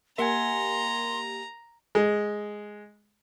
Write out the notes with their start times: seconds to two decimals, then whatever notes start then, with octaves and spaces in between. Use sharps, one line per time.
0.18 A#3 G4 A#4 E5 F#5 G#5 A#5 C6
1.95 G#3